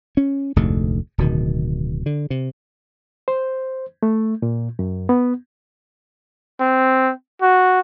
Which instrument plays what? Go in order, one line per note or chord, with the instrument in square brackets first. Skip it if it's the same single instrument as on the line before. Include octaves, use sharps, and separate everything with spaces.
[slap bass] C#4
F1 D2 G#2 D3
D1 B2 D#3
D3
C3
[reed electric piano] C5
A3
A#2
F#2
B3
[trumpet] C4
F#4